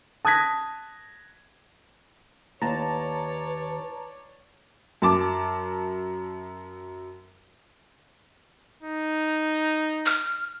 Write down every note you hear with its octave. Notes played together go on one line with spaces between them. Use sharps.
A5 D#6 F#6 G#6 A#6 B6
D#2 B4 C#5 D5 A5 A#5
F#2 A5 D6
D#4
F6